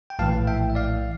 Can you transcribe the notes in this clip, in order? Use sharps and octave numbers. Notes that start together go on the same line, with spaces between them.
G5
A#1 A2 E3 F5 A5
E5 G5
E5
D5 F5